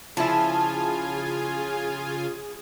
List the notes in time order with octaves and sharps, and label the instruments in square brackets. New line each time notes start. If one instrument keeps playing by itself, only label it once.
[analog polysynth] C#3 F4 G#5 [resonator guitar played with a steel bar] F3 E4 [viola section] G#4 [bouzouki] A5